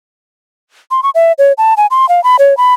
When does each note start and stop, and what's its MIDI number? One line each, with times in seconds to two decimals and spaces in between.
0.91 1.01 84
1.03 1.10 85
1.15 1.32 76
1.38 1.53 73
1.58 1.74 81
1.77 1.86 80
1.91 2.08 84
2.09 2.23 77
2.24 2.36 83
2.39 2.57 73
2.57 2.74 83